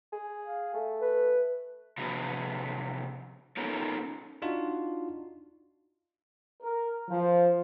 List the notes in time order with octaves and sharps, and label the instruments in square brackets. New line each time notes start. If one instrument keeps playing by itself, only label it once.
[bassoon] G#4
[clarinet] F5
[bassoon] A3
[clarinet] B4
[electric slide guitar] C3 F3 D4 F#4 G#4 B4
B3 C#4 D#4 F4 A4 A#4
[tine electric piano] D4 D#4 F4 F#4
[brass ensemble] A#4
F3